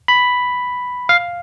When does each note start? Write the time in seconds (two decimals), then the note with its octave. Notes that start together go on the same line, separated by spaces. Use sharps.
0.08 B5
1.09 F5